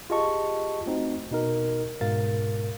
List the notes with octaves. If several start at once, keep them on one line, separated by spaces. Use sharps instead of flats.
F4 G4 G#4 D#5 A5 C#6
A3 C4 D#4 F#4
B2 D#4 A#4
G#2 B2 A#4 F5 A6